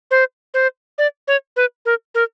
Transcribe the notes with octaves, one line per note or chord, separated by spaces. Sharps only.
C5
C5
D5
C#5
B4
A#4
A#4